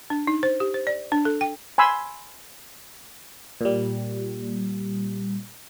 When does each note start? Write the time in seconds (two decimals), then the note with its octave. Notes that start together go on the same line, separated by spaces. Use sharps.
0.10 D4
0.27 D#4
0.43 C5
0.60 G4
0.74 C5
0.87 D5
1.12 D4
1.25 A4
1.41 G5
1.78 G#5 B5 C6 E6
3.61 A#2 G3